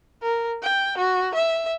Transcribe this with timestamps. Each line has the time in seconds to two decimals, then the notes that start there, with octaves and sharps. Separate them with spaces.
0.22 A#4
0.63 G5
0.98 F#4
1.34 E5